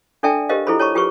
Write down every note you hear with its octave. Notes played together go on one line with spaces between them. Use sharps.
D4 A4 D5 E5 G5 A5
G4 A#4 C5 D#5 F5
E4 F4 G#4 A4 C5 B5
C#5 A5 B5 C#6
F4 G4 G#4 B4 C#6